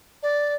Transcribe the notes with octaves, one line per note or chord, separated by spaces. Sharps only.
D5